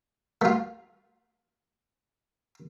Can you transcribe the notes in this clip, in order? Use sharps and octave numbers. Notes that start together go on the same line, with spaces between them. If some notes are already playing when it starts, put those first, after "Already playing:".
A3 F4